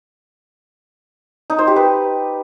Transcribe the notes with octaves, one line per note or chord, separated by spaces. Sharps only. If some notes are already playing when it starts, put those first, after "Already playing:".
D#4
C5
G4
B4